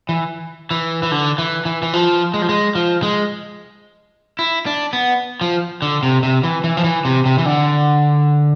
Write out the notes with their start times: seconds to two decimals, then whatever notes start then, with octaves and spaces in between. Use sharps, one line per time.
0.09 E3
0.71 E3
1.03 E3
1.11 D3
1.38 E3
1.65 E3
1.83 E3
1.93 F3
2.34 G#3
2.42 F3
2.49 G#3
2.75 F3
3.03 G#3
4.39 E4
4.66 D4
4.93 B3
5.41 F3
5.82 D3
6.03 C3
6.23 C3
6.43 E3
6.64 E3
6.77 F3
6.84 E3
7.05 C3
7.26 C3
7.38 E3
7.46 D3